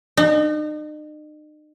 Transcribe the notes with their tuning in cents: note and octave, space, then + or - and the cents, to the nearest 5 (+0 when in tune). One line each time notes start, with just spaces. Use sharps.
D#4 -40